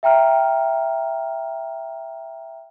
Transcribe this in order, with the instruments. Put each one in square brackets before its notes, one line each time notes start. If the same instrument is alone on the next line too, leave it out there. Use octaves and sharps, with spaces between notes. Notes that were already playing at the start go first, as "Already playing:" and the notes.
[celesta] E5 G5 A#5 F6